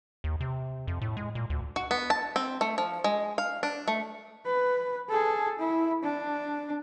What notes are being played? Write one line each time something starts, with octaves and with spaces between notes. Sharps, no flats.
D#2
C3
F2
A2
G#3
A#2
D2
F#4
B3
A5
C4
A3
F3
G#3
F5
D4
A3
B4
G#4 A4
E4
D4